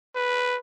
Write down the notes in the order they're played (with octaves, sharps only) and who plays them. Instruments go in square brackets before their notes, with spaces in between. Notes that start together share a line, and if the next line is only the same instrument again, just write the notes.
[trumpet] B4